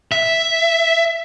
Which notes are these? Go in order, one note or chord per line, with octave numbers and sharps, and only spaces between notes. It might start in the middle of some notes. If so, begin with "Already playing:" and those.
E5